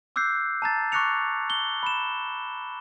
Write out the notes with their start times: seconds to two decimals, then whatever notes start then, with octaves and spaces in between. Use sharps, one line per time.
0.16 D6 E6 F#6 G6 C7
0.62 A5 A#5 A6
0.92 C#6 D6 F#6 A#6 C#7 F7
1.50 G7
1.83 B5 E7